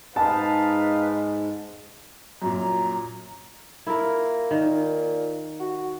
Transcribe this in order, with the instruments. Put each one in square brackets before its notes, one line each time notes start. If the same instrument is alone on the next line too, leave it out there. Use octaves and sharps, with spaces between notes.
[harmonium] G#2 G#3 [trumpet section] D#4 B4 F5 [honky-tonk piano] A5
[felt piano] F#2 A#2 [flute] A#5
[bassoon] A#3 [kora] E4 F4 A#4
[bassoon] A#2 [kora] D#3
[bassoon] F#4